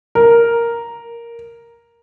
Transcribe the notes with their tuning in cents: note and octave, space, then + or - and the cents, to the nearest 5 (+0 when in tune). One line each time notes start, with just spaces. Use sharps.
A#4 +0